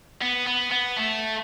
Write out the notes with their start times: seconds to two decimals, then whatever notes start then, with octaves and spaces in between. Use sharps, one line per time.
0.22 B3
0.47 B3
0.72 B3
0.97 A3